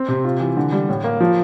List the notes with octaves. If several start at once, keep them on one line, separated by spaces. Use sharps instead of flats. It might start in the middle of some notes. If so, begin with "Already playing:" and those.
Already playing: C4
C3
F4
E3
D3
G3
A2
A#3
F3